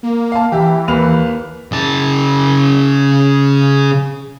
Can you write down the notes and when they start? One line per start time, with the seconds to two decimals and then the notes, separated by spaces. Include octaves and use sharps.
0.03 A#3
0.32 F5 A5
0.52 E3 G4 E5
0.88 D#2 B4 F7
1.72 C#3 A5